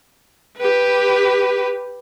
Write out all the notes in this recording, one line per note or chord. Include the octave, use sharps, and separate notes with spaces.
G4 B4